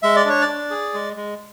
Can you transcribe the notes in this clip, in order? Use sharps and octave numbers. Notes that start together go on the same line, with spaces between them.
G#3 E5
D5
D4 C#5
D5
D4
G#4
G#3
G#3